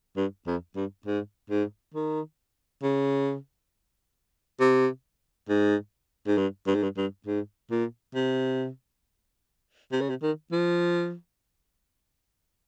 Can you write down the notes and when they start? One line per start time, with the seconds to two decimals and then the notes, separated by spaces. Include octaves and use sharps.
0.17 G2
0.47 F2
0.76 G2
1.06 G#2
1.50 G#2
1.94 D#3
2.83 C#3
4.60 C3
5.49 G#2
6.27 G#2
6.37 G2
6.67 G2
6.75 G#2
6.83 G2
6.97 G2
7.27 G#2
7.71 A#2
8.15 C3
9.92 C3
10.01 C#3
10.10 C3
10.22 D#3
10.52 F3